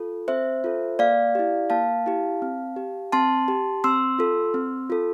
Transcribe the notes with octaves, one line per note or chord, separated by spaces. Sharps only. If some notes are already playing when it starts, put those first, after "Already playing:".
Already playing: F4 A4
C4 C5 E5
F4 A4
A#3 D5 F5
E4 G4
A#3 F5 A5
E4 G4
C4
G4
C4 A5 C6
G4
C4 C6 E6
F4 A4
C4
F4 A4